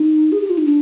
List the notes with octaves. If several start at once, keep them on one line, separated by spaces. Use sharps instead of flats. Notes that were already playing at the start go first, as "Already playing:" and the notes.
Already playing: D#4
G#4
G4
F4
D#4
D4